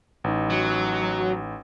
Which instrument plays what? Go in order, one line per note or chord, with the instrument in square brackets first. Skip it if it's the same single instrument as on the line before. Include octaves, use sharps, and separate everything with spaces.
[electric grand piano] A1 D#4
[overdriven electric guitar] F#3